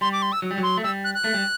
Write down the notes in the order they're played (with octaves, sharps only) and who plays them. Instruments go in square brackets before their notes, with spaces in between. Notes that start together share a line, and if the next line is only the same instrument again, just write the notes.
[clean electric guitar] G3 [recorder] C6
[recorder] D6
C6
E6
[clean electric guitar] F#3
G3
F#3
[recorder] C6
[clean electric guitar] A3
[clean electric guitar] G3 [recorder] E6
[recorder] F#6
F#6
[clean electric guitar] A3
G3